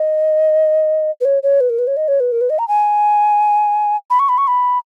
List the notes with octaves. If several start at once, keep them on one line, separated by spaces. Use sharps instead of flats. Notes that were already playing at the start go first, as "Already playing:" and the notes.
Already playing: D#5
B4
C#5
C#5
B4
A#4
B4
C#5
D#5
C#5
B4
A#4
B4
D#5
A#5
G#5
B5
C#6
B5
C#6
B5